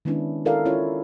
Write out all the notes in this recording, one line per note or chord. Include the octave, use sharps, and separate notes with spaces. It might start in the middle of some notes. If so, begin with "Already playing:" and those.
D#3 G#3 B3 C#4 D4 E4
E4 F#4 A4 A#4 D5 F5
C#4 E4 F4 C#5